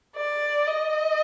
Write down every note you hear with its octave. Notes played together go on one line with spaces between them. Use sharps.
D5
D#5